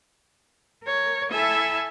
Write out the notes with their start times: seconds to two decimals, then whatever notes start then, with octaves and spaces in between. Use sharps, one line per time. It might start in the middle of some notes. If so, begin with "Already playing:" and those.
0.83 A#4 C#5
1.31 E4 A4 E5 G#5 A5